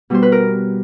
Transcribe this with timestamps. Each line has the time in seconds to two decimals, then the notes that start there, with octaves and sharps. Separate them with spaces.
0.10 B2 G3 B3 C5
0.23 B4
0.32 A#4